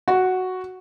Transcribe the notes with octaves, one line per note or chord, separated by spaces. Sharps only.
F#4